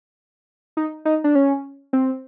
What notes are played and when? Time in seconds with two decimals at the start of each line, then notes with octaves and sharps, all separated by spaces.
0.77 D#4
1.05 D#4
1.24 D4
1.35 C#4
1.93 C4